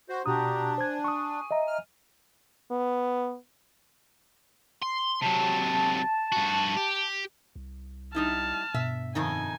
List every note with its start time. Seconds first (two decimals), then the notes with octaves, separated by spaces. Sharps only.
0.09 F#4 C5
0.26 B2 D4 F#4 G4 A#5 D#6
0.78 C5 G#5 G#6
1.04 C#6 D#6
1.51 D#5 E5 A#5
1.67 F6
2.71 B3
4.83 C6
5.22 C3 F#3 A5
6.32 G2 F#4
6.77 G4
7.56 C2
8.15 G3 D#4 E4 A5 F6
8.74 G2 B2 E5
9.15 F2 D#3 D#4 G#5